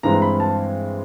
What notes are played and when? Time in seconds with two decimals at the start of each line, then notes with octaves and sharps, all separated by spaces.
0.03 G2 E3 G#3 C4 A#5
0.22 B5
0.40 A5